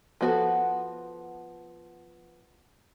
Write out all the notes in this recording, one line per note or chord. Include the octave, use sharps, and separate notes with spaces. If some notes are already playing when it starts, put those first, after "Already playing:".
F3 B3 F#4 G#4 A4